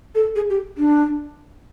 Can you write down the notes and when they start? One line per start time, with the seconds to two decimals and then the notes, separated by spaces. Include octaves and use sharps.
0.15 A4
0.36 G#4
0.50 G4
0.78 D4